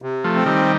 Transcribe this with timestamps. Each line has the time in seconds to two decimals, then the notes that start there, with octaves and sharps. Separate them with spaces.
0.02 C3
0.24 F3 A3
0.35 C4
0.46 D#3 G3